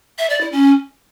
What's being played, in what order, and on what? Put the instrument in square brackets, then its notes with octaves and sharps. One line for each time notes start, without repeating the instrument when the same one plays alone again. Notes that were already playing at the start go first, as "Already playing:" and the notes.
[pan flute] E5
D5
E4
C#4